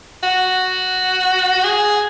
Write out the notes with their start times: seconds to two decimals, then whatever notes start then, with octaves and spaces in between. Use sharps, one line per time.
0.23 F#4
1.64 G#4